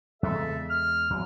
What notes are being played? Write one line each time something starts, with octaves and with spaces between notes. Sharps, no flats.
E2 C#3 G#3 A4 E5
F6
E2 F#3